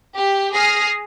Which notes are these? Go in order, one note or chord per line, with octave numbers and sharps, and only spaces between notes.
G4
G#4 D#6 F6 A#6 C7